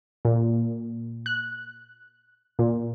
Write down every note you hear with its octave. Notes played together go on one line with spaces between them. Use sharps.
A#2
F#6
A#2